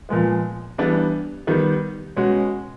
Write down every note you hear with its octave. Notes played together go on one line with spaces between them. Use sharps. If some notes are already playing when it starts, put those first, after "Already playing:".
A#2 F3 G#3 B3
E3 G3 B3 D4
D#3 G3 B3
B2 G#3 C#4 F#4